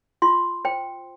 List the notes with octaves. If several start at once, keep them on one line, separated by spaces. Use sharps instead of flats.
F4 C6
C5 G5